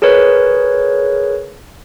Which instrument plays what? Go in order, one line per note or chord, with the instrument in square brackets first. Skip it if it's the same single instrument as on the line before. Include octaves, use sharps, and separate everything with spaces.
[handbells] G#4 A#4 B4 C#5